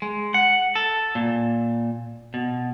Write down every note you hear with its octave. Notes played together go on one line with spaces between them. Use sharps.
G#3
F#5
A4
A#2
B2